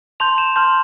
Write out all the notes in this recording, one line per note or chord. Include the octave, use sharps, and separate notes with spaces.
A5 C6 G6 F7
E7
A5 C6 F6 G6